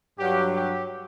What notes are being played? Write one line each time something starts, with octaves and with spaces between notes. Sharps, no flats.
G2 F#3 G4
G4